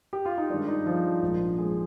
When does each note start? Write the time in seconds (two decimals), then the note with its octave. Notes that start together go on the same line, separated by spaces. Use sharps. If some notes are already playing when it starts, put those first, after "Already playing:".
0.13 G4
0.26 F4
0.38 D#4
0.50 G2 D#3 G#3 D4
0.68 D#4
0.86 F3 F4
1.22 A#1 G#2 F3 A#3
1.58 G#3 G#4